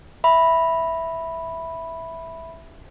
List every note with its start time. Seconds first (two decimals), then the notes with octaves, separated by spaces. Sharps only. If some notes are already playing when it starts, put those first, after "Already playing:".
0.24 E5 B5